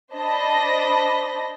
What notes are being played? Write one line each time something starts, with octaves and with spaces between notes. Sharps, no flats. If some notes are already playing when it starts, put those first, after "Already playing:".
D4 C5 D#5 A5 B5 A#6